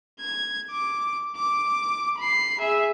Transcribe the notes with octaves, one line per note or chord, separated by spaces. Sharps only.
G#6
D6
D6
B5 C7
G#4 E5